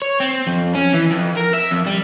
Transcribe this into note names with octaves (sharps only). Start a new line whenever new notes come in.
C#5
C4
F2
C#4
E3
F2
A#4
E5
F2
G3